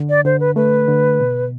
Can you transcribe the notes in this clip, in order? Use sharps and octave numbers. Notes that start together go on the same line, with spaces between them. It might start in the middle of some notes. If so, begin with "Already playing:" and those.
Already playing: D3
D5
D3 C5
B4
A3 B4
D3
B2